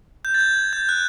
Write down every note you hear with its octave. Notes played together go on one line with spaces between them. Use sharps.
G6
A6
G#6
G6
F#6